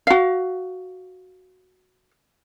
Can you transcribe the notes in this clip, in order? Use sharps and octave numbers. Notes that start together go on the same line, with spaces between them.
F#4 F5